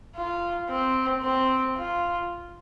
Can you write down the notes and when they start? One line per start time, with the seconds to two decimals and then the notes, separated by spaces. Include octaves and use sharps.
0.16 F4
0.70 C4
1.23 C4
1.77 F4